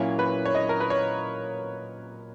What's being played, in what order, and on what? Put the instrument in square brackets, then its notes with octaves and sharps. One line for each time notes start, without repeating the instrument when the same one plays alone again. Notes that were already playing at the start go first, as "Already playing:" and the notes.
Already playing: [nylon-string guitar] A#2 F#3 A#3 C#4 E4 [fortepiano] C#5
[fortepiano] B4
C#5
D#5
A#4
B4
C#5